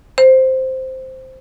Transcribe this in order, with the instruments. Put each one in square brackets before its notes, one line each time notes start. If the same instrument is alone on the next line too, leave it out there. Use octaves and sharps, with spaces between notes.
[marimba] C5